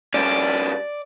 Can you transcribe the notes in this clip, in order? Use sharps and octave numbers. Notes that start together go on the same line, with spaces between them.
G2 C#4 D5